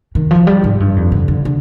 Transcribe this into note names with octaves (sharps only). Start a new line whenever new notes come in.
D#3
F3
G3
G#2
G2
F2
D3
D3
D3